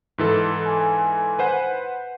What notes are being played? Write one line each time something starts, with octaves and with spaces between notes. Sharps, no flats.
G#2 E3 A4
G#5
B4 C5 F#5